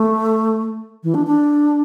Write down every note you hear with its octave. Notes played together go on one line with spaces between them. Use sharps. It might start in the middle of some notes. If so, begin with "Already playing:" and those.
Already playing: A3
E3
D4
D4